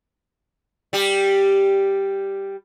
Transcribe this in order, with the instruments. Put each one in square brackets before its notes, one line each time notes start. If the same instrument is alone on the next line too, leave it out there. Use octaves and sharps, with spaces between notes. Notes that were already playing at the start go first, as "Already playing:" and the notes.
[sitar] G3 G4